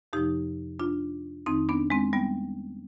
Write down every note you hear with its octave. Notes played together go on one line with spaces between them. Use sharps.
F2 C3 F3 D#4 G4
D4 F4
F2 D#3 C4 D#4
B3 D4
G#3 C4
G3 B3